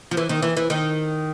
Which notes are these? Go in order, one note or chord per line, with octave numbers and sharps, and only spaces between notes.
F3
E3
D#3
E3
E3
D#3